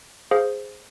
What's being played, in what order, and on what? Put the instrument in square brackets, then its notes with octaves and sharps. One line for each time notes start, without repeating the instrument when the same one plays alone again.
[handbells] G#4 C5 F5